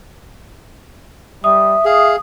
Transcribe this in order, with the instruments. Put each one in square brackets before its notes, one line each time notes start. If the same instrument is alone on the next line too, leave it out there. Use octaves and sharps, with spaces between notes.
[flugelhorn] G3 [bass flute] E5 [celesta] D#6
[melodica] G#4 [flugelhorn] F5